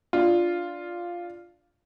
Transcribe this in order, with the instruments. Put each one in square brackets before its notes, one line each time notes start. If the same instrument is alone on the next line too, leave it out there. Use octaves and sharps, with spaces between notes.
[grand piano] D4 F4